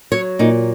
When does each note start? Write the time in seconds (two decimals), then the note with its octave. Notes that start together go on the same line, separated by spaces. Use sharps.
0.12 F#3 C#5
0.39 A#2 D#4